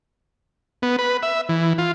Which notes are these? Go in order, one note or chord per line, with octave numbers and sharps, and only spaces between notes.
B3
B4
E5
E3
F4